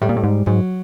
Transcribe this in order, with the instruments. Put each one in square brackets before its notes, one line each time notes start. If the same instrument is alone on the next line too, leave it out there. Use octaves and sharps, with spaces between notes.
[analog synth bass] A2 [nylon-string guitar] G3
[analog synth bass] A#2
A2
G#2
[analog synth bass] G#2 [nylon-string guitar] F#3